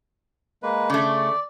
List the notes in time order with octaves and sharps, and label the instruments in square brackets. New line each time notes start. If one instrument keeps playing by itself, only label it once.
[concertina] G#3 A#3 B4
[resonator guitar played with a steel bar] C#3 A3 [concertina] D5